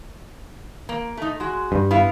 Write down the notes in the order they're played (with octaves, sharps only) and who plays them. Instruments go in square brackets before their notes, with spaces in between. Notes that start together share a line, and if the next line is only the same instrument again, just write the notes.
[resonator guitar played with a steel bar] A#3
A3 D#4
G#3 F#4
[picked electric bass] G2
[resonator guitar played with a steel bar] B3 E4 F5